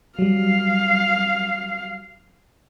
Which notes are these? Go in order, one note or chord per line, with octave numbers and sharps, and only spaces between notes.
F#3 G3 F5